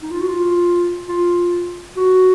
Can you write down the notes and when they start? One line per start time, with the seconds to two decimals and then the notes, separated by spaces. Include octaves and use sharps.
0.02 D#4
0.11 F4
0.21 F#4
0.28 F4
1.08 F4
1.97 F#4